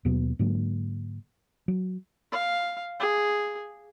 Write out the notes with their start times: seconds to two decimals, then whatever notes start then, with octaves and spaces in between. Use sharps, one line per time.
0.05 D#2 B2 F#3 B3
0.39 G#2 D3 F#3 A#3
1.68 F#3
2.32 F5
3.00 G#4